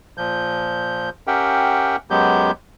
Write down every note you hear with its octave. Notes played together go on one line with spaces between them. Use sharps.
A#2 F3 G6
C#4 G4 A#4 E5 F#5 G5
F#2 F#3 G#3 B3 G4 G6